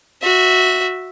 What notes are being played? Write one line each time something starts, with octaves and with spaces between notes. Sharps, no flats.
F#4 E5